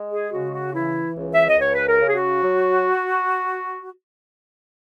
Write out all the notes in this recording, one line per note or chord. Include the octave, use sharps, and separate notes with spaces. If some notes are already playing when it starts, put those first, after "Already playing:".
Already playing: G#3
G#4
C#3 F#4
F#4
E3 E4
C#2
E5
D#5
C#2 C#5
B4
A#4
C#3
G#4
F#4
F#3